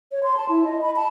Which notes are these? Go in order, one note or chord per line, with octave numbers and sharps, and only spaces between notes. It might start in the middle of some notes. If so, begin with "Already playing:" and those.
C#5
C6
A5
E4
D#5
B5
A5